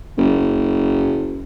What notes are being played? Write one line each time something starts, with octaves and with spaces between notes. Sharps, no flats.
F#1